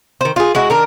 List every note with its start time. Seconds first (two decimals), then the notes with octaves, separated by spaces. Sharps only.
0.21 D#3 C5
0.36 F4 G#4
0.55 G#3 E4 F#4
0.70 D#3 D4 A#4